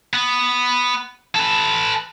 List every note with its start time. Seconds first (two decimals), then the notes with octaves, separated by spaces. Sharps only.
0.13 B3
1.35 A4 B4